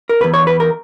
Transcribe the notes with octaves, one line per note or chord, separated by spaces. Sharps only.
A#4
E2 B2 B4
C#5
B4
A#4